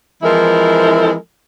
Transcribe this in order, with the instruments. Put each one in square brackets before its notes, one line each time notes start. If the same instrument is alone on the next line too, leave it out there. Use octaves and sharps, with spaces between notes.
[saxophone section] E3 F3 G#3 C4 E4 A#4